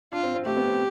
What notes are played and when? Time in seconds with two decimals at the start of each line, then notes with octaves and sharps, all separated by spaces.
0.13 D4 F4
0.23 C4
0.34 C4
0.46 A3 G4
0.57 B3
0.68 C4